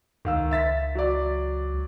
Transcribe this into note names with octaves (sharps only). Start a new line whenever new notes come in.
C#2 D#3 F5 E6
E5 A6 B6
F#3 D5